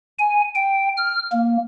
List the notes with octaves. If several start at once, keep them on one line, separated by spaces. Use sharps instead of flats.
G#5
G5
F6
A#3